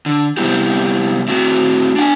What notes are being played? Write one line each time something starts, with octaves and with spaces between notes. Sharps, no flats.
D3
C3 G3 B3 E4 G4
A3 C4 F#4
D4 F#5 G#5